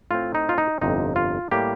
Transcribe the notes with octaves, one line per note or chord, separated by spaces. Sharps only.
A2 A3 C4 F4
D#4
F4
D#4
G1 F2 C3 D#4
F4
A2 G3 A#3 G4